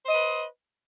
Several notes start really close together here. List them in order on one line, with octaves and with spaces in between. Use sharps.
C5 D#5 B4